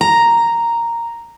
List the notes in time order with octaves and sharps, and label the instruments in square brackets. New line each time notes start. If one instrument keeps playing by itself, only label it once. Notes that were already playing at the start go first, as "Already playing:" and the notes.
[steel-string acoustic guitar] A#5